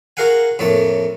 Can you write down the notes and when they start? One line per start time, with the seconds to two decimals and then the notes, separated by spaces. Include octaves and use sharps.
0.17 F#4 G#4 A#4 F5 F#5 G#5
0.59 F2 A2 A3 A#3 C#5 A5